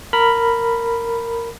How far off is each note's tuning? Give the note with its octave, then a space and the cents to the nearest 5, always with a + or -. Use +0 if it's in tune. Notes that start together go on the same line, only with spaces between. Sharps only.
A#4 -10 B5 +0